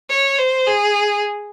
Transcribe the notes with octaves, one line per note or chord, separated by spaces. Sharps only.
C#5
C5
G#4